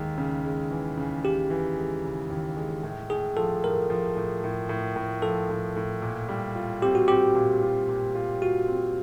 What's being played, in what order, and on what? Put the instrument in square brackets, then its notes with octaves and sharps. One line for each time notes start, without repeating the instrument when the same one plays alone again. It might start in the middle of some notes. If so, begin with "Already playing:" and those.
Already playing: [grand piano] D#2 G#3
C#3
G#3
E3
C#3
[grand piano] C#3 [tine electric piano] G4
[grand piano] E3
G#3
C#3
D#2
G#3
A2
[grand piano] A2 [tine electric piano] G#4
[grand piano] F3 [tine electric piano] A4
[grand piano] A2 [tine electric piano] A#4
[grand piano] F3
A2
A2
A2
A2
[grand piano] F3 [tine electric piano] A4
[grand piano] A2
A2
A#2
G3
F4
[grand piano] C4 [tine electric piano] G4
[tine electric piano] F#4
[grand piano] C4 [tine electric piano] G4
[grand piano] A#2
F4
A#2
F4
[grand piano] F4 [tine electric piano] F#4
[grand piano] C4